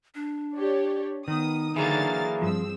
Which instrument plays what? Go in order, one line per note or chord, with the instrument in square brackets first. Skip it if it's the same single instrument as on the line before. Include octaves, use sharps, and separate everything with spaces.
[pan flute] D4
[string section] G4 C#5 D5
[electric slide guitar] D#3 [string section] B3 D#6
[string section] D3 F6 A6 [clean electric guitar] E3 F#3 A#3 [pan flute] G#4
[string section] G2 C4 E6 [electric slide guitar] F3